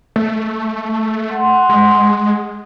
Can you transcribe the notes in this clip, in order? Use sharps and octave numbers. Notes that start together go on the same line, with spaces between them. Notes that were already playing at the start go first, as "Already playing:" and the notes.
A3
F#5 C6
G#3